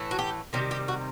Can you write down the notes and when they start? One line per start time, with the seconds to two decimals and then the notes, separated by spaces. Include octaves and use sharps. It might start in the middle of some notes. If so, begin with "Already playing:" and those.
Already playing: A2 E3 A3
0.11 F#4
0.19 G4
0.53 C3 D#3 G3 G4
0.71 G4
0.88 F#4